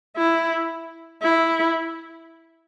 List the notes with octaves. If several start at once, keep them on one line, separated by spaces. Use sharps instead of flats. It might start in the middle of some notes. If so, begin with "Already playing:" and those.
E4
E4